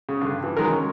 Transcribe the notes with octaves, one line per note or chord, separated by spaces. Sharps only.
C#3
G2 D3
E3
D#3 F#3 G#3 A#4
C#4